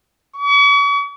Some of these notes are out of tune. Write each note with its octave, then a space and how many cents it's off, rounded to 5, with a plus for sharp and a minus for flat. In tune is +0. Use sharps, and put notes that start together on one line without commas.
C#6 +45